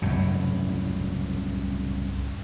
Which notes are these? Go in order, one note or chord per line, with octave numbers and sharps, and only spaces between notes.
C2 F#2 A2 C#3